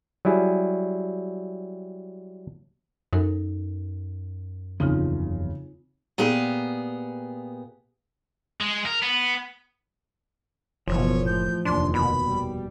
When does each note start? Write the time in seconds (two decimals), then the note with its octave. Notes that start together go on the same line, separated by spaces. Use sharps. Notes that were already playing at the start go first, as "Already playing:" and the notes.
0.25 F#3 G3 E4 G#4
3.13 F#2 D#4 A4 A#4
4.80 F#1 E2 C#3 F3 C4 D#4 F4
6.18 A#2 B3 G4 G#4
8.60 G#3
8.86 A#4
9.02 B3
10.88 F#1 B2 E3 F3 C#5
11.26 A2 G6
11.65 F1 D#2 E3 D4 C6
11.94 B2 B5
12.28 G3